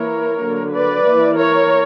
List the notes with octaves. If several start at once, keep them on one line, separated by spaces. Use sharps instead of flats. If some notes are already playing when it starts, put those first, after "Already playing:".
Already playing: E3 A#3 E4 A#4 C#5
D3 F#3 A#3
B4 D5
E3 A#3 E4
A#4 C#5